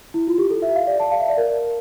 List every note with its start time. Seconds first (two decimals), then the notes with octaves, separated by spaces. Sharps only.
0.14 E4
0.27 F4
0.38 G4
0.50 A4
0.62 E5
0.75 F5
0.87 D5
1.00 A5
1.11 F5
1.20 E5
1.29 D5
1.37 A#4